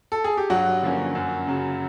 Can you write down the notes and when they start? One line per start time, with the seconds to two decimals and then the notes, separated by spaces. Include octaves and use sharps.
0.12 A4
0.24 G#4
0.37 G4
0.50 G2 F#3 F#4
0.82 D3 F3 A#3 C#4
1.15 F#2
1.47 C#3 F#3